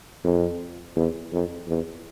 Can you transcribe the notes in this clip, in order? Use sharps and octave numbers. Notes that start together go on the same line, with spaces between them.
F2
E2
F2
E2